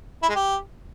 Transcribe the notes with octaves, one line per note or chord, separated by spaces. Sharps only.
E4
G#3
G4